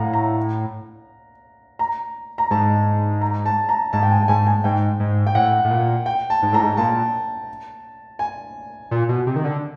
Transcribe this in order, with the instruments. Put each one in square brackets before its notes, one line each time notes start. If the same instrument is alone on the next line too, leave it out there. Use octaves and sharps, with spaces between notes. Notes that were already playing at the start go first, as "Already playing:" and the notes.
Already playing: [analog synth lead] A2 [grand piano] F5 F#5 A#5
[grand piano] A#5
A#5
A#5
[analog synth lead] G#2 [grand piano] A5
[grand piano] A#5
A5
A#5
[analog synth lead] G#2 [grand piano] A5
[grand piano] G5
G#5
A5
[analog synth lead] G#2 [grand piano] G#5
[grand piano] G#5
[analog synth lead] G#2 [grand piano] G5
[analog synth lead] G#2
[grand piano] G5
[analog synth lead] A2 [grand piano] F#5
[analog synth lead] A2
A#2
[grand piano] G5
A5
[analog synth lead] G#2
[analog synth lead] A2 [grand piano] A#5
[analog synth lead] G#2
[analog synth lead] A#2 [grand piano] A5
[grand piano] G#5
[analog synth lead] A#2
B2
C3
D#3
D3